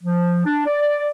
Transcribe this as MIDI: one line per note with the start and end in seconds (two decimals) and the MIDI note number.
0.02 0.45 53
0.46 0.63 62
0.67 1.09 74